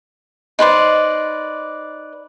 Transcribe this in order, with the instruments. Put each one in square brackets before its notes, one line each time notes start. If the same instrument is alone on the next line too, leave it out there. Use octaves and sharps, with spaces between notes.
[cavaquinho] D#4 B4 C5 D5